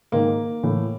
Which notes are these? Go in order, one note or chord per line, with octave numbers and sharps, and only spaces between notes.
G#2 D#3 A#3
A2 E3